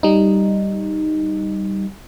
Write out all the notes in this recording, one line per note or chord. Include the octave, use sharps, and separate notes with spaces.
G3 D#4